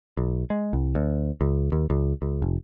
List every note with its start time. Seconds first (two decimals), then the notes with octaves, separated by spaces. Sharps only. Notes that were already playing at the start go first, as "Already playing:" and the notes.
0.17 B1
0.50 G#3
0.73 C2
0.95 D2
1.41 C#2
1.72 D#2
1.90 C#2
2.22 C#2
2.42 F1